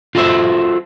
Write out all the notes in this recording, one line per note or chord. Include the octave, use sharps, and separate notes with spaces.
F4 F#4 A4 C5 D5 E5